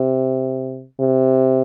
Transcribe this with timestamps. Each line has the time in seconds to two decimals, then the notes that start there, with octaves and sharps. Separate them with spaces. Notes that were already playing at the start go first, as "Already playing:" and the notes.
Already playing: C3
1.00 C3